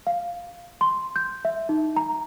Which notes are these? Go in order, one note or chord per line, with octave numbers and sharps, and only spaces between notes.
F5
C6
G6
E5
D#4
A#5